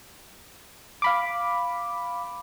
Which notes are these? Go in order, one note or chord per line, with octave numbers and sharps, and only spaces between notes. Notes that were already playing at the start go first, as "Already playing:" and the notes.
F5 B5 D6